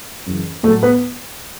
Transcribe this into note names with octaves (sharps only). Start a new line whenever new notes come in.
F#2 C#3 E3
A2 F#3 A3 A4
B3 B4